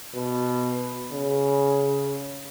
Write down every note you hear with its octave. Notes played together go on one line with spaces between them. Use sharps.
B2
C#3